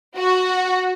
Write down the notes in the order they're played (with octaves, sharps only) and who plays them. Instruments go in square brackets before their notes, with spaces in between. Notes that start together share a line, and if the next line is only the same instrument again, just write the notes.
[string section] F#4